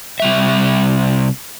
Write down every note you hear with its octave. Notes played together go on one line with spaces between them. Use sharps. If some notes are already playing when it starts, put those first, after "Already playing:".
C3 G3 E5